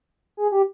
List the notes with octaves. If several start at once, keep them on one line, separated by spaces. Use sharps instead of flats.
G#4
G4